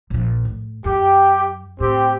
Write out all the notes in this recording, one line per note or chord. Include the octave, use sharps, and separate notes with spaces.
A#1 F3
A2
F#2 G4
A2 C4 G4